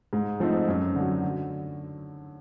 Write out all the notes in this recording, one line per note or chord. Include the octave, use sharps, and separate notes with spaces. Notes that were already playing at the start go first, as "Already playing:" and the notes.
G#2
F3 A3 C4 D#4
F#2
D3
F#3
D3